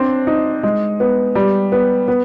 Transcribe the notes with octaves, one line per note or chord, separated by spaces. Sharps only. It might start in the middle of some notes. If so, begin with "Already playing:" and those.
Already playing: C4 D4
D#4
G#3
B3
G3
B3
B3